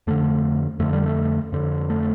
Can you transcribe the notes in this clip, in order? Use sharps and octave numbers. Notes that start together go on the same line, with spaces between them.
F2 D3 A3
F2 D3 A3
G3
A3
F2 D3
A3